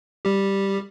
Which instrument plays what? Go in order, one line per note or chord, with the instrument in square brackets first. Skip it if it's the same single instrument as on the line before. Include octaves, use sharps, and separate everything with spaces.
[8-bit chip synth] G3 G4